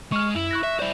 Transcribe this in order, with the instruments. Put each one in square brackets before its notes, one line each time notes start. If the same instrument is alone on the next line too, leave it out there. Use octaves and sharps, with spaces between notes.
[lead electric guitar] G#3 [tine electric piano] C#6 F6
[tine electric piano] F#2 [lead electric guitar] E4
[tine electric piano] C#6 F#6 A#6
[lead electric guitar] E5
[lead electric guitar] E4 C5 [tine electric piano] D5